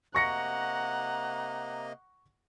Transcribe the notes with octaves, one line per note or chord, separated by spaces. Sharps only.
C3 A#3 D#5 F#5 A#5 C#6 A#6 C#7